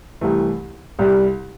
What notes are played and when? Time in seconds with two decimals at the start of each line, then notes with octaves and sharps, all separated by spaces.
0.21 C2 C3 E3 A3
0.99 C2 C3 G3